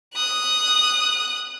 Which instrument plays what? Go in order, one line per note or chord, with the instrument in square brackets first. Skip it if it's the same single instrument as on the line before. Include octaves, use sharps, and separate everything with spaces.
[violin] D#6 F#6